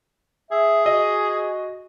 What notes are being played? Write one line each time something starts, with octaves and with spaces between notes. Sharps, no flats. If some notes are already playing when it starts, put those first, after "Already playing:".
G#4 E5
F#4 D#5